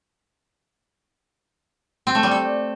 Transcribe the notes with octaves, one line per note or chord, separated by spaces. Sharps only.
C4
A3
G3
A4